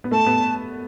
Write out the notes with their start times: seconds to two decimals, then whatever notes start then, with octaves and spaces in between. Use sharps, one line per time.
0.04 B3
0.11 A3 A5
0.26 B3